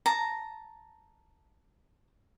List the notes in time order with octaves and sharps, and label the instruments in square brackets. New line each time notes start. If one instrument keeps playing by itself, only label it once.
[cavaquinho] A5 A#5